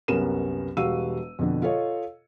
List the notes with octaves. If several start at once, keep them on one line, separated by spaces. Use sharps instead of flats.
C2 F#2 B3 C#4 A#4 E7
E1 G3 F#4 F5 E6 D#7
F2 B2 D3
F4 A4 C#5 D#5